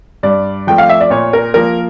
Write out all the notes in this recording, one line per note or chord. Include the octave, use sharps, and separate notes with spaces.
G2 D5
F3 A3 G5
F5
E5
D5
A#2 C#5
A#4
F3 A#3 A#4